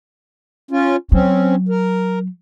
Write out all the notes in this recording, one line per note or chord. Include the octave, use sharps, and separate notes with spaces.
C#4 F4
F#3 C4 C#4
A#4